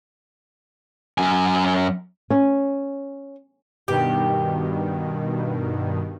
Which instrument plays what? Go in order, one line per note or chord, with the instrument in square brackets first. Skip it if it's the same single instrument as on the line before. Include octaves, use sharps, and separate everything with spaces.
[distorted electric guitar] F#2 G#5
[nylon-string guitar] C#4
[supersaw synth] G2 B2 D#3 [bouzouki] G4